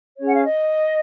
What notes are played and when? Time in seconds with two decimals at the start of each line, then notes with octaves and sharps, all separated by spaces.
0.17 C#4 G#4 C#5
0.26 F#5
0.35 F5
0.44 D#5